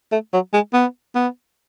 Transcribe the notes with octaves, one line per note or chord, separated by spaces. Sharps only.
A3
F#3
G#3
B3
B3